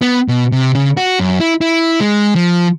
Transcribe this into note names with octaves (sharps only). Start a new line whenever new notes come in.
B3
B2
C3
C#3
F#4
F#2
E4
E4
G#3
F3